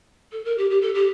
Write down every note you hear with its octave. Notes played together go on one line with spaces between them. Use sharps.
A4
A#4
G4
G4
A4
G4